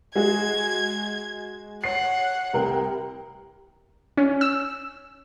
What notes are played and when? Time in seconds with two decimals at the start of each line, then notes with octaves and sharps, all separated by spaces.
0.15 G#3 F#4 G#4 G#6
1.84 C#5 F#5 C7
2.53 C2 A#4 G5
4.17 C#4
4.41 E6